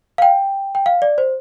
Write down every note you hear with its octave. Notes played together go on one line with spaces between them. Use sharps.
F5
G5
G5
F5
D5
C5